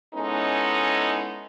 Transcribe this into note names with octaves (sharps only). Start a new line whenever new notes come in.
G#3 B3 C#4 D#4 E4 A4